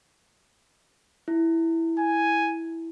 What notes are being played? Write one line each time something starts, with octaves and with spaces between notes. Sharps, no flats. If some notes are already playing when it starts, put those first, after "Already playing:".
E4
G#5